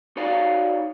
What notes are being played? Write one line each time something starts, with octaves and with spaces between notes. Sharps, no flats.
D#4 F#4 C#5 D5 F5